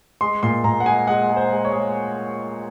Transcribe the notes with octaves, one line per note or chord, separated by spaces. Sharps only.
G#3 C6
A#2 C6
A#2 A#5
F#5
G#3 G#5
G#3 F#5
G#3
C5
G#3
C#5
G#3